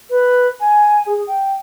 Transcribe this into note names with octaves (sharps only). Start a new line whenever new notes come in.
B4
G#5
G#4
G5